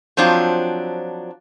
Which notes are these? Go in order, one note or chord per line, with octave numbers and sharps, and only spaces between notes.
F3 F#3 C4 D4 F4